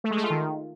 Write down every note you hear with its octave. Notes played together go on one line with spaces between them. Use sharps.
A3
G#3
A3
F4
D#3